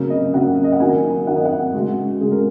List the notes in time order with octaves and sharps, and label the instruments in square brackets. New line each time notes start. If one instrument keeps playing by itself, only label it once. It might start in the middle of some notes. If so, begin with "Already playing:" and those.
Already playing: [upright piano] C#3 F#3 A#3
D#5
C#3 F#3 A#3 F#5
D#5
F#5
D#3 F#3 A#3 G#5
D#3 F#3 A#3 F#5
D#5
F#5
C#3 G#3 F#4
C#3 G#3 G#4
A#4